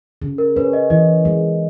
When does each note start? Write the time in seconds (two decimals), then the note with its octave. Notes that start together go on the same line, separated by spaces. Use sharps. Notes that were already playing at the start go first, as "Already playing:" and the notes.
0.22 C#3
0.38 A#4
0.56 C#4 B4
0.73 D#5
0.90 E3 D#5
1.25 G#3